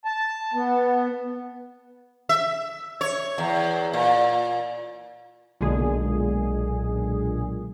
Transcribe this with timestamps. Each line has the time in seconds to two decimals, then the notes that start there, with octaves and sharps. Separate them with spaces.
0.05 A5
0.54 B3
2.29 E5
3.01 C#5
3.38 E2
3.93 A#2
5.61 B1 A#2 D3 G#3 G#4